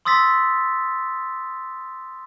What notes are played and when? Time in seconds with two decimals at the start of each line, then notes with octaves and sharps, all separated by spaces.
0.05 C6 D#6 E6 A6 B6